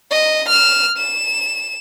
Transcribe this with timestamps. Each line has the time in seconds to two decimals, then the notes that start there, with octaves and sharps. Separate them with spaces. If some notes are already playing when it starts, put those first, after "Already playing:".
0.11 D#5
0.49 F6 E7
0.98 E7